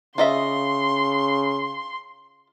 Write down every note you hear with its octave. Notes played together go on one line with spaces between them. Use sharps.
C#3 F4 D#5 E5 C6